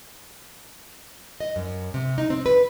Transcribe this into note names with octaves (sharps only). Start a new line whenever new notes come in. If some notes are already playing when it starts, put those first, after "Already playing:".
D#5
F#2
C3
D#4
C4
B4